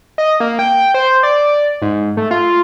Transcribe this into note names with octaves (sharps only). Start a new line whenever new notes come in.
D#5
A#3
G5
C5
D5
G#2
A3
F4